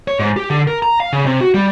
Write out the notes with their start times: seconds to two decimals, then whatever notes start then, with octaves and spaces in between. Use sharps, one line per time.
0.08 C#5
0.19 G#2
0.36 G4
0.50 D3
0.68 A#4
0.82 A#5
1.00 F5
1.13 C#3
1.26 C3
1.41 F#4
1.54 G3